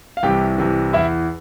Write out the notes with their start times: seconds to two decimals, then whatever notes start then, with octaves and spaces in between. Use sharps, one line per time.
0.17 F5
0.23 C2 C3 E3 G4 G5
0.58 C2 C3 E3
0.93 E2 E3 E4 E5